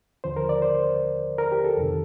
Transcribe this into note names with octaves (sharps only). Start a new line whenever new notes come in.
D#2 D3 F3 C5
A#4
D5
C5
A#4
G4
A4
F2 C3 D#3